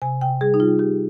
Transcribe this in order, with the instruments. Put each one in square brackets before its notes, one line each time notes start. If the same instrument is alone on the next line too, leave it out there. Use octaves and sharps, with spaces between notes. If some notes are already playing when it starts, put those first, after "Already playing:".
[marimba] C3 G#5
C3 G5
G3 G#4
D#4
G3 F4
C3 G4